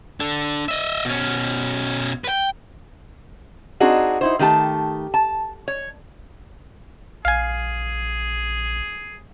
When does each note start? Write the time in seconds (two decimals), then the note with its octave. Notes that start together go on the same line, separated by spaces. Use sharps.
0.20 D4 A4
0.68 D#5 E5
1.05 B2 C#4
2.24 B4 G5
3.80 C4 D4 D#4 F#4 G#4
4.21 D#4 E4 C5
4.39 D#3 A3 G4 A5
5.14 A5
5.68 C#5
7.25 A#1 G#4 F5 G#5